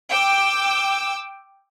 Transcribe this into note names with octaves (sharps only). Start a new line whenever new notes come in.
G5 D6 E6